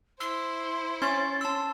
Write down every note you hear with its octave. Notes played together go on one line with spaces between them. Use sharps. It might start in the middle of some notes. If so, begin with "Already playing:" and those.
E4 C5 C6 E6
C#4 C#5 C6 A6
A5 C6 E6